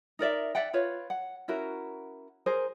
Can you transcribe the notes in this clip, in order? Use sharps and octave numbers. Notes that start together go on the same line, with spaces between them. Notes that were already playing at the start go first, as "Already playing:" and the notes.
D#4 A#4 D5 E5
D5 E5 F#5 G5
F4 B4 C#5
F#5
C#4 E4 F#4 A#4
G#4 A#4 C5